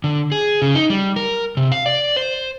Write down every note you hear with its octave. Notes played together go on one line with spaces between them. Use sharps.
D3
G#4
C#3
D#4
G3
A#4
C3
F5
D5
C5